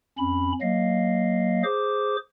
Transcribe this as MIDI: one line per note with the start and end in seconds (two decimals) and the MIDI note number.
0.18 0.52 41
0.18 0.52 61
0.18 0.52 83
0.62 1.63 54
0.62 1.63 58
0.62 1.63 75
0.62 1.63 77
1.64 2.16 68
1.64 2.16 72
1.64 2.16 86